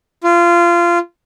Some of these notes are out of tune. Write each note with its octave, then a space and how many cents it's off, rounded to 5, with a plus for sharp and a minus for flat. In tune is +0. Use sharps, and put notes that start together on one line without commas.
F4 -20